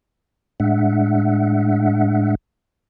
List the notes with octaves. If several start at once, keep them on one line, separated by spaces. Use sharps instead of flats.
A2 G#3 D4 E5 F#5